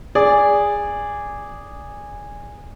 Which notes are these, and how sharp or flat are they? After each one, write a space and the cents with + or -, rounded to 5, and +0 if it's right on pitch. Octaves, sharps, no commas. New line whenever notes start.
G#4 -15 D5 -10